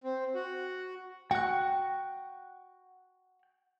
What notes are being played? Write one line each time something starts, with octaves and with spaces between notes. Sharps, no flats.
C4
F#4
F#4 G5 C#6 F#6